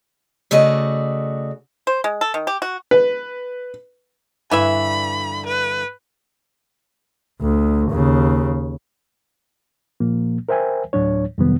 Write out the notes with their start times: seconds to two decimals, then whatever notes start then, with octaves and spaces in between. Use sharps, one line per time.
0.51 C#3 A3 F#4 D5 D#5
1.87 C5
2.04 G#3
2.21 A4
2.34 D#3
2.47 G4
2.62 F#4
2.91 B4
4.51 G2 D3 E3 E4 E5 B5
5.46 B4
7.41 D2
7.91 D#2 C#3
10.00 A#2 F3 A#3
10.49 A#4 C5 E5 G5 G#5
10.93 D2 A2 F#3 D4 C#5
11.38 F2 C3 D#3 F#3 G3 B3